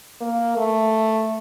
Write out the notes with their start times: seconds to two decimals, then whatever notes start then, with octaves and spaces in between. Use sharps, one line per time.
0.21 A#3
0.57 A3